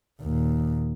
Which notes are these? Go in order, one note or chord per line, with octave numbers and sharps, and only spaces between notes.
D#2 A#2